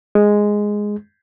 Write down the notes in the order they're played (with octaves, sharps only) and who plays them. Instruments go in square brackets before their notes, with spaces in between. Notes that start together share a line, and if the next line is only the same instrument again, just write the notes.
[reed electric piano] G#3